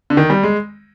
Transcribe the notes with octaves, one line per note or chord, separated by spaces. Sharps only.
D3
D#3
G3
G#3